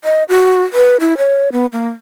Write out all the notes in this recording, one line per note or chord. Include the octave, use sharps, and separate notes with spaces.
D#5
F#4
B4
E4
C#5
B3
A#3